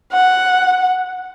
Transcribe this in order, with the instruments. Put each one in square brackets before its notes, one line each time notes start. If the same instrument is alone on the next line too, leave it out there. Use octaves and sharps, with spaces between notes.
[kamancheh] F#5